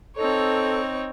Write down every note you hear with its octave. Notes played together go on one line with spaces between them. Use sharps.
C4 D#4 A4 C#5